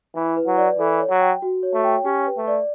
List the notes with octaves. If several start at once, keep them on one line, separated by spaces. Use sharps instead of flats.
E3 E4
B4
F#3
D5
E3 A4
C#5
F#3
G5
F#4
C#5
A3
G5
C#4 G4
B4
A3
D5